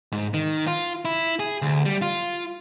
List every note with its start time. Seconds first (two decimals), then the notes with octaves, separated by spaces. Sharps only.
0.12 G#2
0.34 D#3
0.67 F4
1.05 E4
1.40 G#4
1.62 D2
1.85 G3
2.02 F4